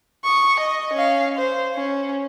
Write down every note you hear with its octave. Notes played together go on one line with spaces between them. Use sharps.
C#6 D#6
D#5
C#4 F5
C5
C#4